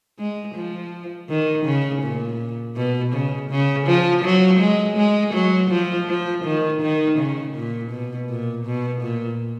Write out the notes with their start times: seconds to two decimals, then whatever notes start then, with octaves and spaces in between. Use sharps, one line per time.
0.19 G#3
0.55 F3
1.29 D#3
1.65 C#3
2.02 A#2
2.76 B2
3.13 C#3
3.50 C#3
3.87 F3
4.24 F#3
4.60 G#3
4.97 G#3
5.34 F#3
5.70 F3
6.08 F3
6.44 D#3
6.81 D#3
7.18 C#3
7.55 A#2
7.91 B2
8.29 A#2
8.65 B2
9.01 A#2